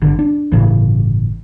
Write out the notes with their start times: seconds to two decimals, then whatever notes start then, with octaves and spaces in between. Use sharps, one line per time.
0.01 G1 D3
0.19 D4
0.52 G1 A2 C#3 E3